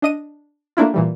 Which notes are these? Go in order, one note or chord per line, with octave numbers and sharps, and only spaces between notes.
D4 D#5 D#7
A3 A#3 D4 E4 F4
A#2 E3 G3